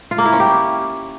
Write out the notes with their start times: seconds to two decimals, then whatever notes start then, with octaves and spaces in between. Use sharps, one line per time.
0.11 F4
0.18 A#3
0.25 E4
0.33 C#4
0.40 G4